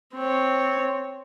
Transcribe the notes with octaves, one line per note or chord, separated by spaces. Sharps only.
C4 C#5